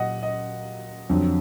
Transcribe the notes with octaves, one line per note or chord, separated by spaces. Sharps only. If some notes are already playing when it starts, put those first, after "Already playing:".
Already playing: A#2 F#3 D#5 F#5
D#5
F2 D3 F#3